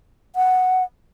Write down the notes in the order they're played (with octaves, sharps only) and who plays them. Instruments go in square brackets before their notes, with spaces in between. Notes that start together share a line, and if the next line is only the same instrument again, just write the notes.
[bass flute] F#5